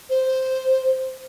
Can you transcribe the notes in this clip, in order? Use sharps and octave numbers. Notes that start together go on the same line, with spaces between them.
C5